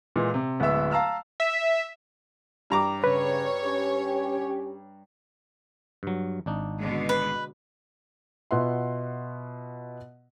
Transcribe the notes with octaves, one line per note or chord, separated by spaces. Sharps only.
A#2 E3 G#3
C3
D1 G#3 B3 E5 E6
F5 A5 A#5 E6 F6
E5
G2 A#5 D6
C#3 B4 C#5
C#4 G4
G2 F#3
G#1 D4 D#4
B2 D3 G#3
B4
B2 F4 B4 E5 F#5 C6